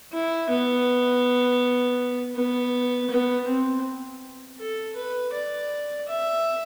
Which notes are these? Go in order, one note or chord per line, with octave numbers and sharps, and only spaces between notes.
E4
B3
B3
B3
C4
A4
B4
D5
E5